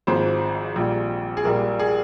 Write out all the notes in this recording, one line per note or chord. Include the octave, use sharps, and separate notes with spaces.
G#1 G#2 F3 C5
A#1 A#2 G3
G#4
A#1 A#2 G3 A#4
G#4